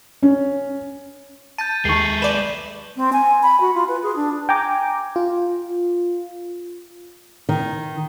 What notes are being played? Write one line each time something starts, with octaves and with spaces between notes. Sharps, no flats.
C#4
A5 G6 A6 D#7
D#2 D#3 G#3 A4 C#6 C7
B4 D5 E7
C4
G#5
B5
F#4
F4
B4
G#4
D4
G5 G#5 A#5 D6
F4
D#3